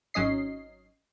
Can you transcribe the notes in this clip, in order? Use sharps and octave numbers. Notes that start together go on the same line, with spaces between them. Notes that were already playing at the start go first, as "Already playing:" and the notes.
G#1 F#3 C#4 D#5 C7